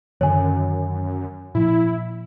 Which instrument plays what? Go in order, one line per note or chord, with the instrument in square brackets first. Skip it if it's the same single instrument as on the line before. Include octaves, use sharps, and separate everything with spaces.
[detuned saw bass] F#2 [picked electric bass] D3 D#3 [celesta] C#5 G#5
[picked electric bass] A#2 F3 [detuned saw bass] E4